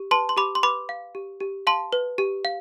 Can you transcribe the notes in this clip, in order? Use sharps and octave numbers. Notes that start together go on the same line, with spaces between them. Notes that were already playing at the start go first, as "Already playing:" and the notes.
Already playing: G4
B4 A5 C6
C6
G4 B5 D6
C6
B4 B5 D6
F5
G4
G4
F5 A5 C6
B4
G4
F5